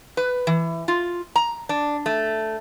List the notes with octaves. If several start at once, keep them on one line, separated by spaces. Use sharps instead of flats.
B4
E3
F4
A#5
D4
A3